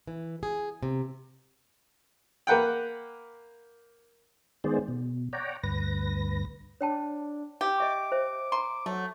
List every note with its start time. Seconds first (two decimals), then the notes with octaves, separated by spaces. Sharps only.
0.07 E3
0.43 G#4
0.83 C3
2.47 A#3 B4 F#5 G5
4.64 D#3 G#3 B3 G#4 C5 D5
4.88 B2
5.33 C#5 D5 F#5 G5 A#5
5.63 D2 G2 B4 A#6
6.81 D4 C#5 G5 A5
7.61 G4
7.78 D#5 E5 C#6 D6
8.12 C5 E5
8.52 A#5 C6
8.86 F#3 A3